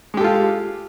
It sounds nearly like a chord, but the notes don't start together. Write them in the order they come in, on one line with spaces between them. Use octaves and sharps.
G#3 G4 A4 F4